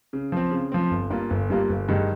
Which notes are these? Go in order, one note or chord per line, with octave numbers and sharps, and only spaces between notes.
C#3
F3 C4
C#3
F3 C4
G1
G2 G3 A#3 F4
G1
G2 G3 A#3 F4
G1
G2 D#3 G#3